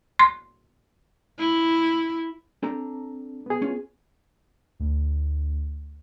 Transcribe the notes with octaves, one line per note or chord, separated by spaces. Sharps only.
C6
E4
C4 D4 A4 A#5
B3 G#4
C#4 F4
D2